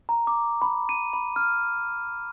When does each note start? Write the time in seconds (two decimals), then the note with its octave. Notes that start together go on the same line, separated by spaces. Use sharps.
0.09 A#5
0.27 D6
0.62 B5
0.89 D#7
1.13 B5
1.36 F6